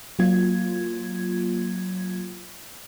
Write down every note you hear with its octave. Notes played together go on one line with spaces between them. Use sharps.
F#3 A#3 F4 G#6